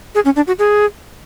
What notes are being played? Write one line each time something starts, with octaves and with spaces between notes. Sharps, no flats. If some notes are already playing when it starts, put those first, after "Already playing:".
G#4
C#4
D4
F#4
G#4